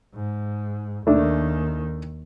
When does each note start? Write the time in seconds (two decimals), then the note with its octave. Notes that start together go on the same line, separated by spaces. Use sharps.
0.15 G#2
1.07 D#2 D#3 A3 D4